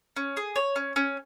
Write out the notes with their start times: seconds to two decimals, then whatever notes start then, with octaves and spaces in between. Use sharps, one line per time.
0.16 C#4
0.37 G#4
0.56 C#5
0.76 C#4
0.96 C#4